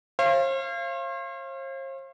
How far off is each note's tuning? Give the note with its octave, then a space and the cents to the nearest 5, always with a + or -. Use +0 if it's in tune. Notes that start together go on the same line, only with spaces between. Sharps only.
C5 +45 F5 -30